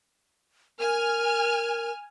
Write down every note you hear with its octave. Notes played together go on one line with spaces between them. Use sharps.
A#4 G#5 F6